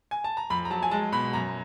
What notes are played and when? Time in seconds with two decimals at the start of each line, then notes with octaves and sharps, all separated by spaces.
0.11 G#5
0.24 A5
0.37 A#5
0.50 F2 B5
0.65 A#5
0.70 F#3 A5
0.83 G#5
0.91 G#3 A5
1.12 B2 B5
1.33 F#2 A#5